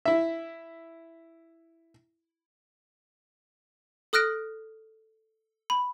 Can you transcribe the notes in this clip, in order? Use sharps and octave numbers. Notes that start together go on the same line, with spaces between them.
E4 E5
A4 D#6 F6 F#6 A#6 D7
B5